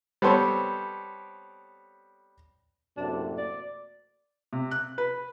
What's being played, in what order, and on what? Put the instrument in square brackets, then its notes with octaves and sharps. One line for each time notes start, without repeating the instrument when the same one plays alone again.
[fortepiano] G3 B3 C4 A4 C5 C#5
[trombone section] F#2 A2 C3 [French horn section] A3 A#3 F#4 [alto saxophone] D4
[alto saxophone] D5
[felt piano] C3
F#6
B4